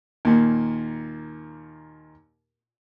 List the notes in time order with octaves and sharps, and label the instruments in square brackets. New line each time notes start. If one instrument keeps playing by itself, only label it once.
[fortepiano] D#2 A#2